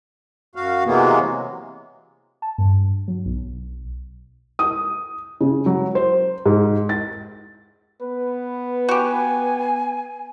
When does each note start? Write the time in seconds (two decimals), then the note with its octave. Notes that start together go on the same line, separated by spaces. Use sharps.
0.55 F#2 F#4 F5
0.85 C3 E3 F#3 G#3 A#3 B3
2.42 A5
2.58 G2
3.08 F#3
3.25 B1
4.59 D#6
5.41 C#3
5.66 F#3
5.95 C5
6.46 G#2
6.89 A6
8.02 B3 B4
8.89 F#4 G4 G#5